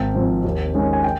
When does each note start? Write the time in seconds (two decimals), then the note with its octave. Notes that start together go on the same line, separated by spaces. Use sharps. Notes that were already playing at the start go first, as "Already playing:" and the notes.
Already playing: G#1 G5
0.14 G#2 F3 C4
0.44 D#2
0.74 D#3 G#3 C#4
0.93 G#5
1.04 G5